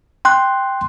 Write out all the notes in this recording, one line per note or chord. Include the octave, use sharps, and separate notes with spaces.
G5 C6 F#6